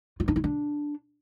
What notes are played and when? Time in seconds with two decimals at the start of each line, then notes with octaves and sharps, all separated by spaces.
0.20 F4
0.28 D4
0.36 E4
0.44 D4